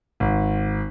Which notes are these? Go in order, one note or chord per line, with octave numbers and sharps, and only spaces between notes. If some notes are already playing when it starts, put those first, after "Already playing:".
G#1